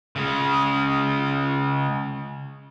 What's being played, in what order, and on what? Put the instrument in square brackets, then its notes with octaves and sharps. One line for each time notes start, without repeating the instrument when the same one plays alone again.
[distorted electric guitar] C#3 G#3